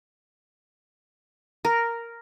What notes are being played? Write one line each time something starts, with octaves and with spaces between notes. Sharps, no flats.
A#4